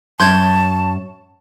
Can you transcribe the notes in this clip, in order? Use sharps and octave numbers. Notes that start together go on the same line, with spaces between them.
F#2 C#5 A5 C6 G6 G#6